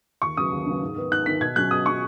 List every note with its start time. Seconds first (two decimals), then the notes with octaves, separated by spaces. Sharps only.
0.22 D#2 C#6
0.37 C#3 F#3 B3 D#6
0.52 D#2
0.66 C#3 F#3 B3
0.82 G#2
0.96 D#3 B3
1.11 G#2 F#6
1.26 D#3 B3 B6
1.41 B2 G#6
1.56 F#3 C#4 F#6
1.71 B2 D#6
1.86 F#3 C#4 C#6